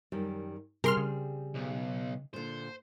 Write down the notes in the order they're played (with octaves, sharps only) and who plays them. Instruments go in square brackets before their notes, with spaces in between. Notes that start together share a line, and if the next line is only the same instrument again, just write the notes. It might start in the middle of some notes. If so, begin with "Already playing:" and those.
[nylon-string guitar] F#2 D#3 G3
[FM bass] C3 [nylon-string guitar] G3 C4 G#4 [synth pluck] A#4 C6 F6
[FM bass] C#3
[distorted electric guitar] B1
[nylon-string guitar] A#2 D3 [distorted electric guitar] C5